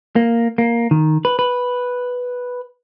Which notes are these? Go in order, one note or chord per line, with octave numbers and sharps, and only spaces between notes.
A#3
A#3
D#3
B4
B4